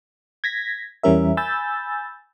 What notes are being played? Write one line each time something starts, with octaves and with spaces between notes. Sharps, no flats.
G#6 A#6 B6
E2 E3 G3 C#4 A#4 E5
G#5 B5 E6 G6 A6